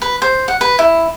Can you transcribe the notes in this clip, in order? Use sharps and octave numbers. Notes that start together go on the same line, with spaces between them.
B4
C5
F#5
B4
E4